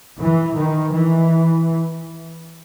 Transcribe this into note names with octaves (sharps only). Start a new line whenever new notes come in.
E3
D#3
E3